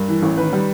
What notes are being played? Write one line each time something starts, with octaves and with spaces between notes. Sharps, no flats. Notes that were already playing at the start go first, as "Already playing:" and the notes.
Already playing: G2 A#4
E3
A1
D#3 B4
G3